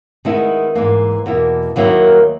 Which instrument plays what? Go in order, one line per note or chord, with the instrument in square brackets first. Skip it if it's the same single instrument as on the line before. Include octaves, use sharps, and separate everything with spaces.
[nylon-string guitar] D#3 G#3 B3 E4
G#2 E3 A#3
E2 B2 A#3 E4
D#2 D#3 F#3 A#3 E4